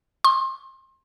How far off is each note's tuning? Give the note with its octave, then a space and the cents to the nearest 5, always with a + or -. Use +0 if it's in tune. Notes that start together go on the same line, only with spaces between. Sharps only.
C6 +30